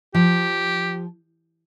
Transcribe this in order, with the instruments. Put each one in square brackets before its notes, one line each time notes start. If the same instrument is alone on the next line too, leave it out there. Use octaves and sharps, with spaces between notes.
[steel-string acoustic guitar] F3 [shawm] G4